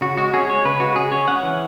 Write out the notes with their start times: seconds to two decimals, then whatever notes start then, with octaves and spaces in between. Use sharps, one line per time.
0.01 C#3 F#4
0.18 G#3 F#4
0.34 C#4 G#4
0.49 G#3 C#5
0.65 C#3 B4
0.80 G#3 F#4
0.95 C#3 G#4
1.11 C#4 C#5
1.28 C#4 F#5
1.43 E3